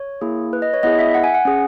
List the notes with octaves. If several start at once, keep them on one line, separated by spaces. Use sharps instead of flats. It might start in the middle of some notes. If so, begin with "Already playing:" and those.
Already playing: C#5
A#3 E4 G#4
B4
D#5
C#5
B3 E4 G#4 D#5
E5
F#5
G#5
F#5
C#4 G#4